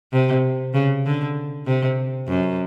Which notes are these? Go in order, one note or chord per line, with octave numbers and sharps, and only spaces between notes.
C3
C#3
D3
C3
F#2